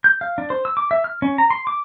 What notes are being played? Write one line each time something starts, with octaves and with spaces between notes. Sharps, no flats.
G6
F5
D4
C5
E6
D6
E5
F6
C#4
A#5
C6
D6